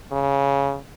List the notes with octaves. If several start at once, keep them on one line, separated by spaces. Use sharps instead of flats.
C#3